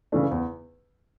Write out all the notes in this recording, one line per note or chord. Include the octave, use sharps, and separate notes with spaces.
C#3 E3 A3 D4
E2